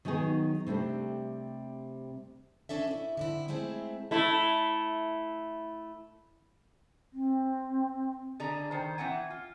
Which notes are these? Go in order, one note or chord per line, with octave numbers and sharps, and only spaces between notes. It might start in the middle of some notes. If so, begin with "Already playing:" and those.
D#3 F#3 B3 D#4 G#4
C3 G3 A3 D4
C#4 D4 A4 E5
E4 E5
D3 C4 E4
G#3 A3 C4 E4 G#4
A3 E4
C4
D3 G#4 D5 A#5
D#3 C5
E3 C4 F#5 G#5
F4